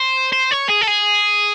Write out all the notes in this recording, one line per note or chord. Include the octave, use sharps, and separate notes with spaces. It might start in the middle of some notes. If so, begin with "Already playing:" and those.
Already playing: C5
C5
C#5
G#4
A4
G#4